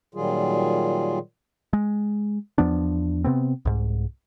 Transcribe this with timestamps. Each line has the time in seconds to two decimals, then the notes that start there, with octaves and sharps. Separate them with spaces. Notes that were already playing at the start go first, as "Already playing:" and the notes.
0.15 A#2 D#3 F#3 G3 F4 G#4
1.73 G#3
2.58 E2 F3 B3 D4
3.24 C3 B3 C4
3.65 C2 G#2